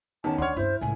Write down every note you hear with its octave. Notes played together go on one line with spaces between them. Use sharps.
E2 D#3 C#4 A5
D2 D4 C#5 F#5 C6 F6
G2 C#4 E4 C5
C#2 A2 G#5